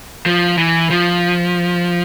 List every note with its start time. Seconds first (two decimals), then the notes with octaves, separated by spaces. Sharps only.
0.26 F3
0.58 E3
0.90 F3